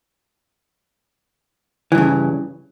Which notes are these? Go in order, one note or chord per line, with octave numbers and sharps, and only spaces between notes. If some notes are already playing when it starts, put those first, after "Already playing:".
G2 C#3 E3